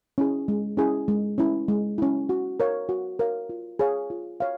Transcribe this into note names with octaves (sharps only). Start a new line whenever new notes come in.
C#4 E4 G#4
G#3
C#4 E4 G#4
G#3
C#4 E4
G#3
C#4 E4
F#4
A#4 C#5 F5
F#4
A#4 C#5 F5
F4
G#4 C#5 F5
F4
C#5 F5